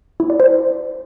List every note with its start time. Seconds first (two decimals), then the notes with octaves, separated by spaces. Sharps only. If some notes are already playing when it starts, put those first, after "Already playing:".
0.20 E4
0.30 D5
0.40 C5